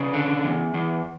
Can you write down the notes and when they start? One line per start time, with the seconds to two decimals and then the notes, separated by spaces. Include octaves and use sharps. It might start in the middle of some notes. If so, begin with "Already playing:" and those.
Already playing: C#3 B4 D5
0.13 D3
0.44 E2
0.74 E2